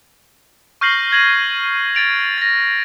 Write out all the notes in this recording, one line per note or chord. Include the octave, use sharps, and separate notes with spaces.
C#6 F6 G6 A#6 C7 F#7
G#6 A#6 D#7 F#7
G#6 A6 D7 F7
A6 A#6